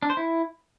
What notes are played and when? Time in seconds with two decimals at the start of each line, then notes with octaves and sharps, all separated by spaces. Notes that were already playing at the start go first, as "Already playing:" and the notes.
0.02 D4
0.10 C5
0.17 E4